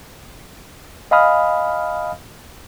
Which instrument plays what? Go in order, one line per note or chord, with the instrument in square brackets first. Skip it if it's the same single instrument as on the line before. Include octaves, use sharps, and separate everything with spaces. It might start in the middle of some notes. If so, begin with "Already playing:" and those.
[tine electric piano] D#5 F5 G#5 B5 D#6 F6